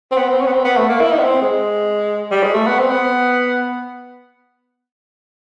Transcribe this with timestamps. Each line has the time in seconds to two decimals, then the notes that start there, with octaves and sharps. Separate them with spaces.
0.11 C4
0.17 B3
0.28 C4
0.41 C#4
0.47 B3
0.52 C4
0.64 B3
0.76 A3
0.88 A#3
1.00 E4
1.12 D#4
1.19 B3
1.24 C4
1.42 G#3
2.31 G3
2.43 G#3
2.54 A3
2.67 B3
2.79 C4
2.90 B3